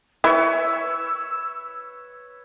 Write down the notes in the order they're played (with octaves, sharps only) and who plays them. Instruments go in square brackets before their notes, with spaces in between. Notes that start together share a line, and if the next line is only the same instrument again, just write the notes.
[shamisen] E4 A#4 E5 [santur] B4 C#5 [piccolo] E6